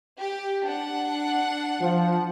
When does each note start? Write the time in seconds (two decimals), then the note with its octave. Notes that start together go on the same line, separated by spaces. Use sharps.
0.19 G4
0.67 D4 F#5
1.81 F3